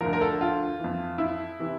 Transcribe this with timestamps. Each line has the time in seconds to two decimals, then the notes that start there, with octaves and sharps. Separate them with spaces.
0.01 D2 D3 F3 A#4
0.13 A#4
0.21 A4
0.41 F4
0.79 F2 E3
1.18 E4
1.59 C3 E3